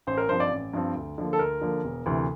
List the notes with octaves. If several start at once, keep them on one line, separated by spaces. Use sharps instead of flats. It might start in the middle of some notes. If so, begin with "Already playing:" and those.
A1 C5
A#4
G2 F3 C4 C5
D5
A1
G2 F3 C4
D2
D3 F3 A#3
A4
D2 A#4
D3 F3 A#3
E1
D2 C3 E3